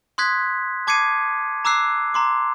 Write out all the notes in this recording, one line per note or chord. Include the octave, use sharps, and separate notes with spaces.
C6 D#6 F#6 G#6 B6
A5 D6 G#6 C7 C#7 D#7
A#5 D6 E6 F#6 C7
A#5 C6 D6